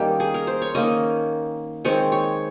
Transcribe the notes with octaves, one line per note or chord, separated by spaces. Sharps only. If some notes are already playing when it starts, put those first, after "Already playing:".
Already playing: D#3 G3 A#3 C#4 G4
G#4
A#4
C5
C#5
D#3 A#3 C#4 D#5
D#3 G#3 C4 C#5
C#5